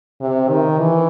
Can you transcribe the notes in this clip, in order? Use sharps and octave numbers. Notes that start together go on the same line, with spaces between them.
C3
D#3
E3